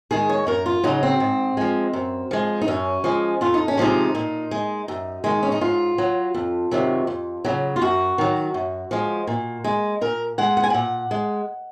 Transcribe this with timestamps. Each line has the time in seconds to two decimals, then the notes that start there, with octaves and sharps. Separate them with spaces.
0.11 D#3 G#3 G#4
0.29 C#5
0.47 F#2 A#4
0.66 F4
0.84 C#3 F#3 D#4
1.03 C4
1.20 G#2
1.57 F3 G#3
1.93 F#2
2.31 F3 G#3
2.62 D#4
2.68 F#2 C#4
3.04 F3 G#3
3.41 F2 F4
3.54 D#4
3.68 C#4
3.77 C3 F3 G#3 D#4
4.15 A#2
4.51 G#3
4.88 F#2
5.24 D#3 G#3
5.43 C#4
5.52 D#4
5.61 G#2 F4
5.98 F#3
6.34 F2
6.71 C3 D#3 F#3
7.07 F2
7.45 C#3 F#3
7.76 F4
7.81 F#2 F#4
8.18 D#3 F#3
8.54 F#2
8.91 F3 G#3
9.27 A#2
9.64 G#3
10.01 A#2 A#4
10.38 G#3 F#5
10.57 F#5
10.64 G#5
10.70 A#2 F#5
11.11 G#3